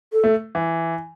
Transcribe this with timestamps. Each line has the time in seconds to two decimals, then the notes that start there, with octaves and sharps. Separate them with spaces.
0.13 A4
0.24 A3
0.55 E3